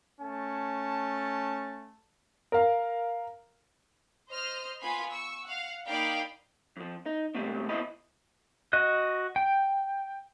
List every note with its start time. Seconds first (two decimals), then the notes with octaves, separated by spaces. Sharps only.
0.21 A3 C#4 A5
2.52 A#4 F5
4.30 C5 D#5 F6
4.81 B3 F4 G#5 B5 C6
5.12 C#6 E6
5.44 F5 F#5
5.88 A#3 D#4 D5 F5 G5 B5
6.77 F2 F3
7.06 D#4
7.35 G#2 B2 G3 A3 C4
7.69 C#2 B2 E4 C5 D#5 B5
8.73 F#4 D#5 F#6
9.36 G5